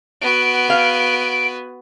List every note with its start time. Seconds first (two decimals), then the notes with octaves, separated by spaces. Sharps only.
0.21 B3 F#4 D7
0.68 G#4 F5